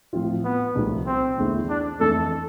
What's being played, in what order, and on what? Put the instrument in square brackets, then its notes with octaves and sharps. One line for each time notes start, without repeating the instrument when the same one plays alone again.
[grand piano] A2 F3 C4 F4
[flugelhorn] B3
[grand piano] C2 C3 F3 A3
[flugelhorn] C4
[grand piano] E2 D3 A3 E4
[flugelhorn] D4
[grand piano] F2 E3 A3 [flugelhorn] A4